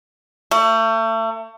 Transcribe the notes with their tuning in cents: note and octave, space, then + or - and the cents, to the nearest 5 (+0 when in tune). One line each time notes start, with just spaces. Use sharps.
A3 +35